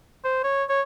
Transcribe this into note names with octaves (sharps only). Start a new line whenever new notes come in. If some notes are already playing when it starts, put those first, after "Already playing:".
C5
C#5
C#5